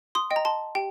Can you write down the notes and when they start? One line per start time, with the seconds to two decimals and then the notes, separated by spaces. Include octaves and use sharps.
0.15 C6 D#6
0.31 D#5 G5
0.36 A#5
0.45 A5 C6
0.75 G4 G5